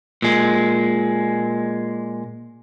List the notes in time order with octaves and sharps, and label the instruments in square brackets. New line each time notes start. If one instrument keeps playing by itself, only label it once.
[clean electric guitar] A#2 G#3